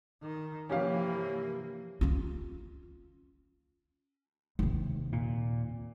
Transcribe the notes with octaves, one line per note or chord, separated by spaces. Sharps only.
D#3 F6
G2 C3 E3 F3 A#3 C#4 G4 F5
C#4 F4
D#2 C3
A#2